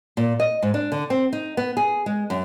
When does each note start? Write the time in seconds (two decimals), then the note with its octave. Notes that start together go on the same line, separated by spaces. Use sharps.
0.17 A#2
0.40 D#5
0.62 G#2
0.74 D4
0.92 D3
1.10 C4
1.33 D#4
1.57 B3
1.77 G#4
2.06 G#3
2.30 F#2